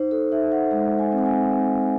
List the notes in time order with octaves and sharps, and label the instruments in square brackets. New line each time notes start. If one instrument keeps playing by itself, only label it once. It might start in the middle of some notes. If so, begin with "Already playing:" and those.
Already playing: [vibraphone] D#4 C5
A4
D#4 E5
F#5
G#3
G#5
C4
F#5
G#5
C4